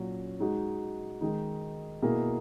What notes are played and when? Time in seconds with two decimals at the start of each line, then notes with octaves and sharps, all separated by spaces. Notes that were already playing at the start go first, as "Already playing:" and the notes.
Already playing: A#2 F#3 C#4
0.40 G#3 D#4 F#4
1.21 D#3 G#3 D#4
2.02 B2 A#3 E4 G#4